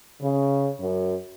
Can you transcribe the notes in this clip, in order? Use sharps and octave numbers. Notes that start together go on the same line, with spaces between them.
C#3
F#2